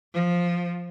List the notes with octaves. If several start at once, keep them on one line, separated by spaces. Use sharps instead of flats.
F3